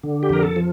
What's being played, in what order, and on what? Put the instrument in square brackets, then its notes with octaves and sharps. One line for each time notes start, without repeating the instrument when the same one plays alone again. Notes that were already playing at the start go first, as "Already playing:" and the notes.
[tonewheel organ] D3
G4
F2 A#4
A4
F3